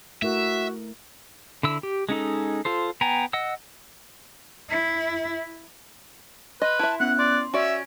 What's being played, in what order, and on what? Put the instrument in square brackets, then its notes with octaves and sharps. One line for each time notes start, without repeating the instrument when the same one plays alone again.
[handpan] A3 E4 A#4 [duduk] F#4 [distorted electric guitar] E5
[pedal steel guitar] D3 E4 E6
G4
G#3 C#4 D#4 A4
F4 A4 C5
B3 G5 G#5 A#5
D#5 F#5 E6
[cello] E4
[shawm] B4 [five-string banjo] D#5 [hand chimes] C6
[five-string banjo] E4 E5 [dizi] A5
[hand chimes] B3 C#4 [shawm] F#5 [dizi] F#6
[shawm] D5 [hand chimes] C6
[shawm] C#4 [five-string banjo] F#4 D5 [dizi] E5 [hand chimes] G#5 D7